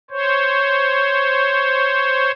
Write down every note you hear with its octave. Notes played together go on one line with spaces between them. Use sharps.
C5 C#5